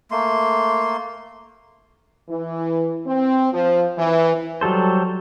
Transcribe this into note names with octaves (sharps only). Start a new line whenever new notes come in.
A3 A#3 C6
E3
C4
F3
E3
F#3 G3 A4 C5